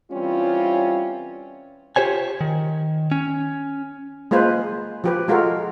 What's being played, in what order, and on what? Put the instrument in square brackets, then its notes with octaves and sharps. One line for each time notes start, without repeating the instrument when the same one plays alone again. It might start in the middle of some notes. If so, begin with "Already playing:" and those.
[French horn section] E3 G3 C4 C#4 F4
[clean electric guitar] F4 G4 C5 C#5 G#5
D#3
C#4
[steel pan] G#3 A#3 F4 B4 C5
F3 G4 B4
G#3 F4 F#4 A4 A#4